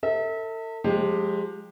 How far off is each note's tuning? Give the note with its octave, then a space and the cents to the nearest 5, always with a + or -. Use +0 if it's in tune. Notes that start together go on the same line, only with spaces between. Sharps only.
A4 +40 E5 -35
F3 +35 G#3 +0 G4 +15